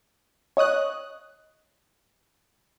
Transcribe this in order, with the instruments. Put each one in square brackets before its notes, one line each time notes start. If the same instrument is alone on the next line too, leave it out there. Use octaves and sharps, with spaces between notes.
[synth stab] C#5 D#5 D#6 F#6